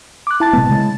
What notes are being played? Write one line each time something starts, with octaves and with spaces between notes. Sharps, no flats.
D6 F#6
E4 A5 A6
B2 G#3 B3
C#3 G#3